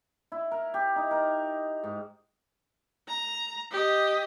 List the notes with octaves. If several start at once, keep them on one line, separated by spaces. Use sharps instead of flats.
E4
A#4
G4
D#4
A#4
G#2
A#5
G4 D#5